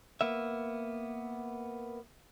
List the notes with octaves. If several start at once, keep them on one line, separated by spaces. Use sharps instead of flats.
A#3 B3 E5